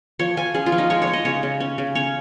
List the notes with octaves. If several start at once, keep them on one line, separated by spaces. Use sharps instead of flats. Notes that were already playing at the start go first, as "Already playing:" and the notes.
F3 C#5
F3 G#5
C#4 G#4
F4
F3
D#4
G#3 C#5
C#5
D#4
D#5
C#3 C#5
C#3
C#4
C#3
C#4 C#5